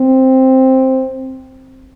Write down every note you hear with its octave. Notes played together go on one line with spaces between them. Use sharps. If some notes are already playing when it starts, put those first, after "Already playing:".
Already playing: C4